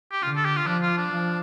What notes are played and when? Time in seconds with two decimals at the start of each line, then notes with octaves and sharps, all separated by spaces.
0.12 G4
0.22 D3 F4
0.36 A4
0.45 G4
0.56 F4
0.67 F3 D4
0.83 F4
0.97 D4
1.12 F3